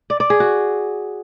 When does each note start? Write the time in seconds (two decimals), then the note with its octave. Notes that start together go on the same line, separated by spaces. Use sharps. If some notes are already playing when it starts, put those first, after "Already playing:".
0.10 D5
0.20 D5
0.30 G#4
0.40 F#4